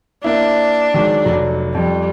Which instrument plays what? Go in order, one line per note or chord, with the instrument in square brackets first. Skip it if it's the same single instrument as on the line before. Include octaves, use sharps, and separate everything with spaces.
[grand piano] A#3 E4 [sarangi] D4
[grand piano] D#3 F#3 G#3
F1 F#3
[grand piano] F2 [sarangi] G3